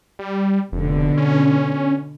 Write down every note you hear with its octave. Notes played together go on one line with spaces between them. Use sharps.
G3
F1 B2 D3
C#4